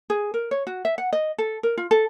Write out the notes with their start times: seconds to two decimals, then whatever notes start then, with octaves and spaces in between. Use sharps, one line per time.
0.10 G#4
0.34 A#4
0.51 C#5
0.67 F#4
0.85 E5
0.98 F#5
1.13 D#5
1.38 A4
1.63 A#4
1.78 F4
1.91 A4